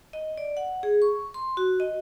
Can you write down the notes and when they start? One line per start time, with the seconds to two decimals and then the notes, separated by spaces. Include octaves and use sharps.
0.13 D#5
0.38 D5
0.57 F#5
0.83 G#4
1.02 C#6
1.34 C6
1.57 F#4
1.80 D#5